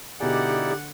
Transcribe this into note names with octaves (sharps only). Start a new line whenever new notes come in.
B2 D3 D#4 E4 G4 G#4 D5 F#5